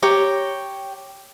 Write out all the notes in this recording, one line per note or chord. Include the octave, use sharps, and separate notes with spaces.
G4 C#5 A#5